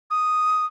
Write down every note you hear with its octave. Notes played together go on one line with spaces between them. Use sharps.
D#6